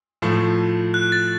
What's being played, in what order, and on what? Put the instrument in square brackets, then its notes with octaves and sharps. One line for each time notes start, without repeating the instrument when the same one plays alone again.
[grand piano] A2 F3 A3
[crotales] F#6
A6